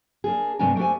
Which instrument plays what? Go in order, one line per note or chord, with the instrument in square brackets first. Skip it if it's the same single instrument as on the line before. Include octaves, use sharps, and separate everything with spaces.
[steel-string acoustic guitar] A#3 D4 G#4
G2 C3 A3 D4 G#5 A#5
A3 D4 G4 C5 G#5